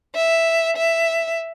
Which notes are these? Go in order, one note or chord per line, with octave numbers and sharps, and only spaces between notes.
E5
E5